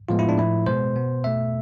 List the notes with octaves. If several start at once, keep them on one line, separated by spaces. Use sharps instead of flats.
A2 F3 G#3 B3 F4
E4
D4
A2 F3 A3 E4
B2 G#3 B3 C5
B2 B3
B2 A3 E5